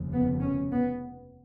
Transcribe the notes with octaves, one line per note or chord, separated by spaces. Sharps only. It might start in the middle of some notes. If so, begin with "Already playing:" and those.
Already playing: F1 D#2 C#3
B3
C#4
B3